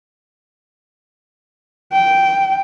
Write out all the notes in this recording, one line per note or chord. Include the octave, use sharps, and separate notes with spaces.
G5